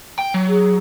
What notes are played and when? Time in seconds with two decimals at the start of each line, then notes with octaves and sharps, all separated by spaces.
0.19 G5
0.34 F#3
0.49 G#4